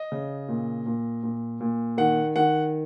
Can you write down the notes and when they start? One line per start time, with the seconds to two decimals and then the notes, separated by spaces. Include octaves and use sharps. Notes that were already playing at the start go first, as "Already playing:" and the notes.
Already playing: D#5
0.12 C#3
0.48 A#2
0.86 A#2
1.23 A#2
1.61 A#2
1.98 D#3 F#5
2.36 D#3 F#5